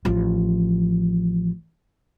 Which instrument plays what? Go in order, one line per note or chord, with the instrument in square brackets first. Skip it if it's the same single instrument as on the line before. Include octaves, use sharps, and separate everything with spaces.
[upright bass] A1 F3